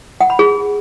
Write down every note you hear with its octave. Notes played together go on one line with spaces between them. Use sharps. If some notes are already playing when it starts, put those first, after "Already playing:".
F#5
B5
G#4